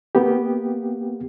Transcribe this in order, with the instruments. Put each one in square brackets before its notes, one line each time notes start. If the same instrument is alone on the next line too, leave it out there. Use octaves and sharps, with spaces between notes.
[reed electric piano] A#3 B3 G4